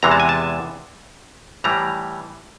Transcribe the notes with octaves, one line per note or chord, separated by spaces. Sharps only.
E2 C3 E3 G#3 A#5
A5
G#5
A5
A2 E3 G3 A#5